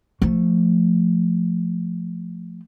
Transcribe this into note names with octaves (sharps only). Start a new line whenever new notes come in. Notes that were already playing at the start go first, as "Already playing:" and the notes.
F3 A3